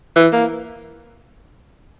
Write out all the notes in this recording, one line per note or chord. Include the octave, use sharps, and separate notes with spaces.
E3
A#3